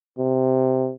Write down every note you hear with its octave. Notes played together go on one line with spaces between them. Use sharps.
C3